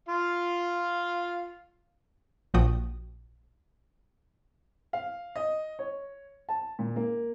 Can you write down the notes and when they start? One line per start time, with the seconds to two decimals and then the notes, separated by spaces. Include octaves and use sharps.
0.09 F4 F5
2.54 A#1 A#2 F3 F#4 G5 D#6
4.93 F5
5.36 D#5
5.79 C#5
6.49 A5
6.79 A#2
6.96 A#3